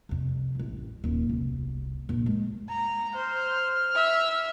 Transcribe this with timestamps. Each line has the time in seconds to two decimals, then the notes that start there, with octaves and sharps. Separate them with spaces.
0.09 C2 F2
0.55 A1 E3
1.04 D#1 A#2
1.29 E1 C2
2.09 A#1 F2
2.26 F#3 G#3
2.68 A#5
3.15 C5 F6
3.95 E5